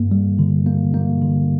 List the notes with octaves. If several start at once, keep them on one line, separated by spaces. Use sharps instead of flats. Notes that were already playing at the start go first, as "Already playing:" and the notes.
Already playing: G2 A#3
G3
D3
A#3
A#3
D3